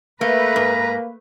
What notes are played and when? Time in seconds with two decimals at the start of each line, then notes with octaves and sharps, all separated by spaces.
0.21 A3 A#3 B4 A#5
0.56 G#2